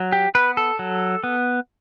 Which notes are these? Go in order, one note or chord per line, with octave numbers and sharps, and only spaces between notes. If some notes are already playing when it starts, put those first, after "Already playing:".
Already playing: F#3
G4
B3 B4
A4
F#3
B3